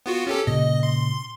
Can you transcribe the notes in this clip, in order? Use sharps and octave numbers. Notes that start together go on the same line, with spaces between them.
B3 F4 F#4
C#4 G4 A4
A#2 C#3 D#5
C6